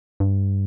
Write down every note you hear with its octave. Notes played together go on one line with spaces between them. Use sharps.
G2